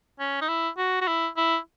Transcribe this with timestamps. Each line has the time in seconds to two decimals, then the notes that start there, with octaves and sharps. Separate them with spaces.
0.20 C#4
0.41 D#4
0.49 E4
0.78 F#4
1.01 F#4
1.08 E4
1.37 E4